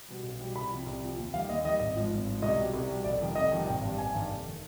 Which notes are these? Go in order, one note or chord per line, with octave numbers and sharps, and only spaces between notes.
B2 G3
B1
B2 G3
C2 B5
C3 F3
C2
C3 F3
D#2
D#3 G3 F5
D#2 D#5
D#3 G3 D#5
G#1 D#5
G#2 F3
G#1
G#2 F3
C2 D#5
B2 G3
C2
B2 G3
F1 D5
F2 C3 D#3 G3
F1 D#5
F2 C3 D#3 G3
G#1 G5
G2 D#3 G3
G#1 G#5
G2 D#3 G3
F1
D#3